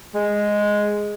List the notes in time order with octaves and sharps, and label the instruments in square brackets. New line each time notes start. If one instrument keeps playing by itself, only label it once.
[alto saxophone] G#3